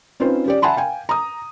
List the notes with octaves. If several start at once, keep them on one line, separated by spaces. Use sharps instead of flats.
C4 C#4 D#4 F4 B4 C5
C#4 G4 D5
E5 F#5 G#5 A5 B5 C6
F5 G5 G#5
A#5 D#6